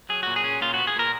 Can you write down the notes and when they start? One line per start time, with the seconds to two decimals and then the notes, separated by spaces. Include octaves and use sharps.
0.09 F#3 G#4
0.23 A#2 F#4
0.36 G#4
0.44 C#4
0.61 A#2 F4
0.74 B3 F#4
0.87 G#4
0.96 A#2 A#4